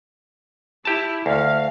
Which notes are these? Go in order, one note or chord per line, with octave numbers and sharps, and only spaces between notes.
E4 G4 A5
D2 F5